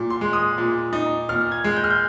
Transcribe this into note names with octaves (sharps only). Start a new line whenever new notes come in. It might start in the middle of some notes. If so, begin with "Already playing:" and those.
Already playing: A#2
C6
G#3
D#6
A#2
D#4
A#2 F6
G#6
G#3
G6
F6
G6